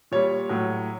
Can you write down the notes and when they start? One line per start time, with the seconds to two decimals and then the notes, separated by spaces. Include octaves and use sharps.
0.11 A#2 G3 C#5
0.49 A2 F#3